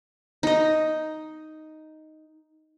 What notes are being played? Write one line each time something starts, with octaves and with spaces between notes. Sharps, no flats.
D#4 D#5